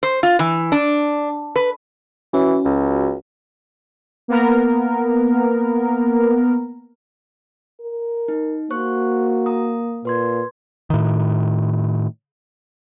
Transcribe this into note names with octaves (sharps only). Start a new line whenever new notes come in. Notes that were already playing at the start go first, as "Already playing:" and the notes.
C5
F4
E3
D4
B4
E3 C#4 F#4
C#2
A#3 B3 A#4
A#4
D#4
A#3 F#4 C5 C#6 F#6
A#5 D#6
A#2 B4 C6 G#6
A2 D#3